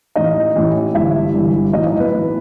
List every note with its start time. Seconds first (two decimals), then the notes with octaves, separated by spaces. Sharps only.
0.15 A1 A2 E3 D#4 D#5
0.55 A1 A2 E3
0.94 G1 G2 E3 E4 E5
1.34 G1 G2 E3
1.73 B1 A2 E3 D#4 D#5
1.87 D#4 D#5
2.00 B3 B4
2.13 A2 E3